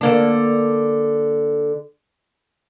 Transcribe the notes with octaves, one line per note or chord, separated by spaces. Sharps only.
D3 A#3 D4